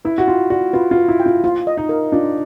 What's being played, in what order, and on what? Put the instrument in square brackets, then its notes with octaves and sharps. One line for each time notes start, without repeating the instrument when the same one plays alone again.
[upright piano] E4 [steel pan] B4
[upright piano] F#4
[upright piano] F4 [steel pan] G5
[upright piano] F#4 [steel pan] D5
[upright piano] F4 [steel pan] B4
[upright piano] F4
[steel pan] B4
[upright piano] E4
[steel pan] G5
[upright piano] F4
[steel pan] F4
D#5
[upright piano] D#4
[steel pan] A#4
[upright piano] D4 [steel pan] F4